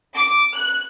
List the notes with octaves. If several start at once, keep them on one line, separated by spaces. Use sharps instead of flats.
D6
F#6